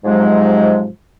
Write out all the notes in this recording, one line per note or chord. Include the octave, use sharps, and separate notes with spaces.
G#2 C3 F3 F#3 G#3